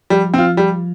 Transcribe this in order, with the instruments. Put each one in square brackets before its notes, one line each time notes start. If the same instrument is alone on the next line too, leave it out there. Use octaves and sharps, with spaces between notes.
[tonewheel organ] F3 [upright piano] G3
[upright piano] C4 F4
G3